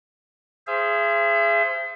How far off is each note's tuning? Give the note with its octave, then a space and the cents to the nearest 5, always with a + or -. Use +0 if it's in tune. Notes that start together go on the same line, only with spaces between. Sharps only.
G#4 +0 C5 +0 E5 +40